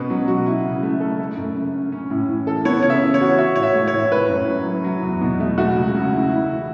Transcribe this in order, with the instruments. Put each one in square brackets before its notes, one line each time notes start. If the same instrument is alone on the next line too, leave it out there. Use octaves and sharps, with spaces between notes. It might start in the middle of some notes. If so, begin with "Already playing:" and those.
Already playing: [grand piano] B2 C#4 [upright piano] B4
[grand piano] F#3
F#4
E4
C#3
A3
A4
A3
F#2
C#3
C#4
C#4
A2
E3
A4
[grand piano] B3 [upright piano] C#5
[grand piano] C#3 [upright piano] C#5
[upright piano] E5
[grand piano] E3
[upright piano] C#5
[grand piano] F#4
[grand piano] F#4 [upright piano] E5
[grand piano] A2 [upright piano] C#5
[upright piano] E5
[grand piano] A3
[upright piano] C#5
[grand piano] A2
[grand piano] A3 [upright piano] B4
[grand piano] F#2
F#3
E4
F#3
E2
B2
A3
[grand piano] A3 [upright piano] F#4
[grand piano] C#2
C#3
E4
E4
E3